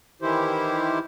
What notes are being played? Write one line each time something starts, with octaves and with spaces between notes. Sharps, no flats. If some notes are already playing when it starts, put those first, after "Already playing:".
D#3 E3 E4 G4 C5